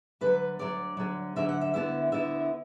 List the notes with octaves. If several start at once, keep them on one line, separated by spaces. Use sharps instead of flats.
D2 D3 F#3 B4
D2 D3 F#3 D5
D2 D3 F#3
D2 D3 F#3 E5
F#5
E5
D2 D3 B3 E4 E5
D2 D3 B3 E4 E5